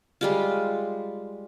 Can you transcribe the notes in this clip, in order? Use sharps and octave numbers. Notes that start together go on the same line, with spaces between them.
G3 G#3 F4